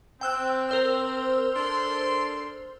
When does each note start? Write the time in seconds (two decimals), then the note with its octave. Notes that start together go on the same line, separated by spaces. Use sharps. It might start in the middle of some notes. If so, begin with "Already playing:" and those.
0.21 C4 G5 E6 F#6
0.69 A#4 C5 E6
1.55 D4 A4 C6